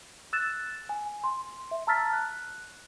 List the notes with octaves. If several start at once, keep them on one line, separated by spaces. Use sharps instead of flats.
E6 F#6 A6 E7
G#5
C6
E5
A5 A#5 E6 F6 A6 B6
F#6